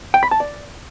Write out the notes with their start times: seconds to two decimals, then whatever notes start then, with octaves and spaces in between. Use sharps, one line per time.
0.14 G5
0.23 B5
0.31 A5
0.40 D5